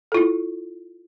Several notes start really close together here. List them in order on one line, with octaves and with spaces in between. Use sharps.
A4 F4 E4